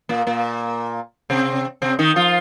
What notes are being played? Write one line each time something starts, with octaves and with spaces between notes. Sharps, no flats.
A#2 A#3
A#2 A#3
C3 C4
C3 C4
D#3 D#4
F3 F4